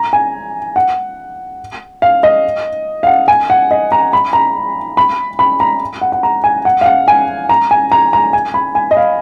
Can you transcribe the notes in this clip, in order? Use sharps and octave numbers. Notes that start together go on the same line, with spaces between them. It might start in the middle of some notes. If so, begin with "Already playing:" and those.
Already playing: A#5
G#5
F#5
F5
D#5
F5
F#5
G#5
F#5
D#5
A#5
B5
A#5
B5
B5
A#5
F#5
F#5
A#5
G#5
F#5
F5
F#5
G#5
A#5
G#5
A#5
A#5
G#5
B5
G#5
D#5
F5